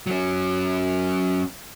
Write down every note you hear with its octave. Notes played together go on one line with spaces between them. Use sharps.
F#3 C#4